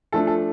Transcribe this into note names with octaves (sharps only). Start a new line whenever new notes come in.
F3 A3 D4 A4
A4